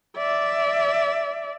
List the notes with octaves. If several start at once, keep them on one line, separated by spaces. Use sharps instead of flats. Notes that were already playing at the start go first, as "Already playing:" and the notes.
D5 E5